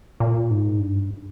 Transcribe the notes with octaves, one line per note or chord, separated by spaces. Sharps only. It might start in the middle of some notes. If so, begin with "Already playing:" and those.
A#2
G#2
G2